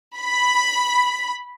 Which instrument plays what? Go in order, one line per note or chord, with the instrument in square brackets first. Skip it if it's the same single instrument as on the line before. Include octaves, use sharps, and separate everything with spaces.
[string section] B5